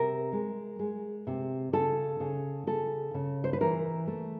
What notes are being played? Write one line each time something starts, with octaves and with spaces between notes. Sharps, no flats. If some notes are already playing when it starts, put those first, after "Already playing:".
Already playing: C3 A#4
G#3
G#3
C3
C#3 A4
C#3
C#3 A4
C#3
C5
B4
E3 A#4
A3